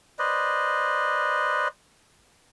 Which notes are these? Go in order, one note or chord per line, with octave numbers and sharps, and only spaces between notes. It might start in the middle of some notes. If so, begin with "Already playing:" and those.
B4 C5 D5 D#5